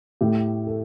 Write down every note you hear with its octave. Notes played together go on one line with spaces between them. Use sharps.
A2 A3 G4
A4